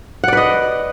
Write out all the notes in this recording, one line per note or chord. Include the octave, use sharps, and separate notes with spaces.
B4 D5 D#5 F#5